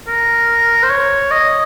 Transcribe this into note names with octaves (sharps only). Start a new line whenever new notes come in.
A#4
C5
C#5
D#5